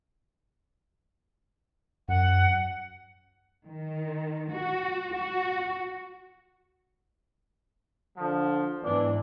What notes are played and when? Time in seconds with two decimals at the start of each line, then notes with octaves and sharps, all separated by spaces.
2.08 F#2 F#5
3.66 D#3
4.53 F#4
5.14 F#4
8.17 D3 F3
8.83 G#2 E3 B3 D4 D5